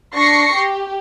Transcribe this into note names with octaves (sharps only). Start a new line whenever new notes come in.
D4 C#6 A#6 C7 C#7
G4